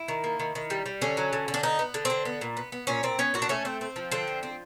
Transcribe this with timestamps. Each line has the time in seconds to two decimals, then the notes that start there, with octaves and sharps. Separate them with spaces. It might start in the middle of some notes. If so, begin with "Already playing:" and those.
Already playing: E4
0.08 D#3
0.24 A#3
0.39 D#3
0.55 D#3
0.70 G3
0.86 G3
1.02 D3 C#4
1.17 F#3
1.33 D3
1.48 D3
1.54 D4
1.63 B3 D#4
1.79 B3
1.94 D3
2.05 D3 C4
2.25 B3
2.41 A#2
2.57 B3
2.72 B3
2.87 A#2 C#4
3.03 A#2 C4
3.19 B3 C#4
3.34 A#2 F#4
3.42 D4
3.49 A3 C#4
3.65 C4
3.81 C4
3.96 F3
4.12 D3 C4
4.27 F3
4.43 C4